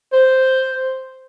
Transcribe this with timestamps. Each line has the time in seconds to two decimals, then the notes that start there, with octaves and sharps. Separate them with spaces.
0.13 C5